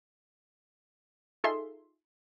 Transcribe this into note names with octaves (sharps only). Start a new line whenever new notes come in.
D#4 F4 G#4 A4 E5 C6